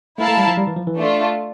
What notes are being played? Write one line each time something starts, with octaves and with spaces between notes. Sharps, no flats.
A3 E4 A#4 F5 A5
A3
G3
F3
G3
E3
F3
E3
A3 D4 F4